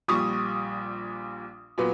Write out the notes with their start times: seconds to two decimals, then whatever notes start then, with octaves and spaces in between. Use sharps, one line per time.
0.08 A#1 A#2 G3 C#6 D#6
1.78 A#2 F#3 B3